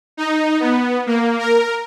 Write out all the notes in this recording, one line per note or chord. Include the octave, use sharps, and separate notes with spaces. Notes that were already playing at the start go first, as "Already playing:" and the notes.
D#4
B3
A#3
A#4